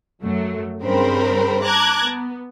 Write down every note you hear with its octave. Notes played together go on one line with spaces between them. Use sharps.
F#2 F#3 A3
G2 C#3 C4 A#4 C5 B5
A5 A#5 D6 F#6 G#6
B3